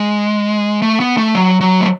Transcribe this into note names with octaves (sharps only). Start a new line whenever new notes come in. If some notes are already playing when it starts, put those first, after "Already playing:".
Already playing: G#3
A3
B3
A3
F#3
F#3
A3